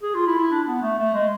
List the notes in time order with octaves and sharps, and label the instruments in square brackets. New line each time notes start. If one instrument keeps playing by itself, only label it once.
[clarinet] G#4
F4
E4
E4
D4
B3
A3
A3
G#3